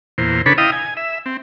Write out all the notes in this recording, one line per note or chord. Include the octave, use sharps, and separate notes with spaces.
E2 A#2 C5
C#3 D4 A4 B4 C#5 B5
E4 D#5 F5 G5 D#6
G#5
E5
C4